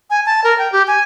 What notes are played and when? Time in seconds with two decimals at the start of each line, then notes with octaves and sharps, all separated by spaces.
0.10 G#5
0.26 A5
0.44 A#4
0.58 G5
0.72 G4
0.87 G#5